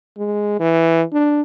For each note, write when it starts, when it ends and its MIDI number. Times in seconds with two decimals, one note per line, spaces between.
0.18 0.58 56
0.60 1.03 52
1.13 1.42 62